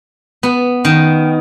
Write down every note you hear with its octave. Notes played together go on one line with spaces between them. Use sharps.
B3
D#3